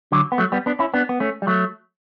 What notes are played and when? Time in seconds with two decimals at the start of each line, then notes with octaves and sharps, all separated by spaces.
0.12 D3 F#3
0.32 B3
0.38 F#3 A3
0.52 G3 B3
0.66 B3 D4
0.79 C#4 E4
0.94 B3 D4
1.09 B3
1.20 A3 C#4
1.42 G3
1.47 F#3 A3